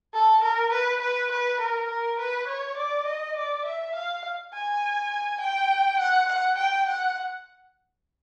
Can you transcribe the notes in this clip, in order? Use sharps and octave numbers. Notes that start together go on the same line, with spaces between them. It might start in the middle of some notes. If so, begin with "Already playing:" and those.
A4
A#4
B4
B4
B4
A#4
A#4
B4
C#5
D5
D#5
D5
E5
F5
G#5
G5
F#5
F#5
G5
F#5